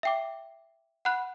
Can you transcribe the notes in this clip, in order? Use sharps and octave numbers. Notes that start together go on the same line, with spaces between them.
E5 G5 D6
F#5 B5 F#6